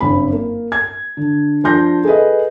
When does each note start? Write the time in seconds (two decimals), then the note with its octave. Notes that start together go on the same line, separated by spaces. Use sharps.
0.01 F#1 G2 C4 B5
0.32 A#3
0.72 G#6
1.17 D3
1.64 F3 D4 C6 G6 A#6
2.05 G#4 A4 B4 D#5